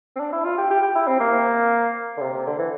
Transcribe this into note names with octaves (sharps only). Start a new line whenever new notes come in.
C4
D4
E4
F4
G4
G4
G4
E4
C4
A#3
D3
C3
C3
D3
E3